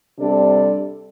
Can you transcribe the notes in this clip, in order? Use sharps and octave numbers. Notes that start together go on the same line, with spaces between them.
C3 G3 D4 A4 D5